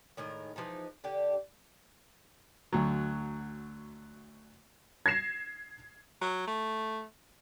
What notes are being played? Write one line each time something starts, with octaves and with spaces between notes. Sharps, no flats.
A2 D#3 G#3 A#4
E3 F3 G#3 D#4
D3 D4 G4
D2 F#3
G#6 A#6 C7 E7
F#3
A3